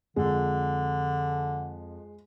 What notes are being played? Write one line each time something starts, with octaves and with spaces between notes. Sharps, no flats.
F2 D3 G#3